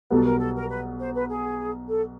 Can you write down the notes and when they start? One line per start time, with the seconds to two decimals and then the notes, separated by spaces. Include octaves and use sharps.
0.11 B1 B2 G3 B3 A4
0.25 A#4
0.40 A4
0.55 A#4
0.70 B4
0.99 C5
1.14 B4
1.29 G#4
1.88 A4